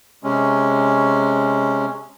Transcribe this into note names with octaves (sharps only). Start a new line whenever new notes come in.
C3 G#3 C#4